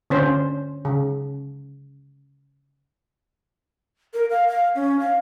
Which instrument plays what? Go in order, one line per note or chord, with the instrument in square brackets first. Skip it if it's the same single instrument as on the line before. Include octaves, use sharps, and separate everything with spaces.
[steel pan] D3 C#4 C5
C#3
[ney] A#4
F5
F5
C#4
F5